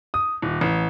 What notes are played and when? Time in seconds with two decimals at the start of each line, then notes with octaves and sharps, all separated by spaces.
0.14 D#6
0.42 D#1
0.61 A1